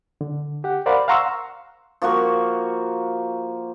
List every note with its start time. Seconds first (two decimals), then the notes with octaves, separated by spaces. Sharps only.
0.21 D3
0.64 G4 F#5
0.86 A#4 C5 D5 F5 F#5 B5
1.08 F5 F#5 A#5 C6 C#6 E6
2.02 F3 A#3 F#4 C#6